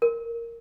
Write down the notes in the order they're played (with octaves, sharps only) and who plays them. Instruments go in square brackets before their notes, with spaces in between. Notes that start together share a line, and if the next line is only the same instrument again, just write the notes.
[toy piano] A#4